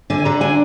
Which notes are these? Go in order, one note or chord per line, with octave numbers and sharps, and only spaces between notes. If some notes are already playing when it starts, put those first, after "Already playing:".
D3 G#5
D3 A#5
D4 G#5